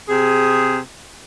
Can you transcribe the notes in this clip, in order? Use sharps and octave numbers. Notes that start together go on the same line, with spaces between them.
C3 G#4